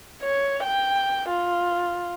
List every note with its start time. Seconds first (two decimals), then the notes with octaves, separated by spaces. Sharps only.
0.23 C#5
0.64 G5
1.29 F4